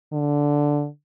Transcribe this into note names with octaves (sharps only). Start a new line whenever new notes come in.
D3